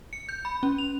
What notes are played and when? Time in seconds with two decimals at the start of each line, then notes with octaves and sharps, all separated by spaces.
0.13 C#7
0.29 G6
0.45 B5
0.63 C#4
0.78 F7